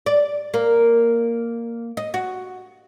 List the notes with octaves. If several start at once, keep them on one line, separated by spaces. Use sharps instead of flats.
D5
A#3
D#5
F#4